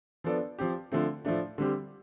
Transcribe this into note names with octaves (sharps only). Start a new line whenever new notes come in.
F3 B3 D4 A4 D5
F3 C4 G4
D3 F3 A3 C4
A2 F3 A3 D4
D3 G3 C4 G4